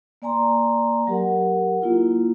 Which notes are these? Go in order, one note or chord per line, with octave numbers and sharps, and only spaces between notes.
A#3 D5 G#5 A#5 C6
F#3 G4 A#4 F#5
A#3 E4 F4